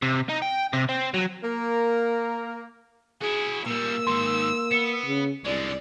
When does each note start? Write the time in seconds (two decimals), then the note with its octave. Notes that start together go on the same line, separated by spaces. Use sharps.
0.02 C3
0.29 D#4
0.42 G5
0.73 C3
0.89 C4
1.14 F#3
1.43 A#3 A#4
3.21 E4 F#4 G#4
3.66 A#2 G3 A#3 E6
4.07 G#2 D#3 C6
4.71 B3 C#7 E7
5.06 C#3
5.45 C2 D3 G#3 D5